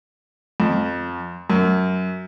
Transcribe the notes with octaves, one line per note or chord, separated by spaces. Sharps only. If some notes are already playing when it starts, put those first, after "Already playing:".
F2
F#2